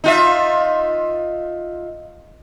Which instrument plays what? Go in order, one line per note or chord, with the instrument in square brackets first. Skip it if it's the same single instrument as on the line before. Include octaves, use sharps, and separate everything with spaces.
[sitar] D#4 F4 E5